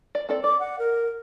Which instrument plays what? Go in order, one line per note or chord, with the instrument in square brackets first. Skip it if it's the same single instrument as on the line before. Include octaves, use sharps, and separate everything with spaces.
[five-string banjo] D5
C4 A4 D5
[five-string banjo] D5 [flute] D6
[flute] F#5
A#4